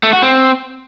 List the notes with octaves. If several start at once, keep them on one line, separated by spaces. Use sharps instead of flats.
A3
F#4
C4